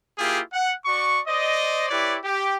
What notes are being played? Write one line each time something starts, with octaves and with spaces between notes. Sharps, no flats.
A#3 E4 F4 G4 G#4
F#5
F#4 D5 C#6
C5 D5 D#5
E4 G4 B4 C#5 D5
G4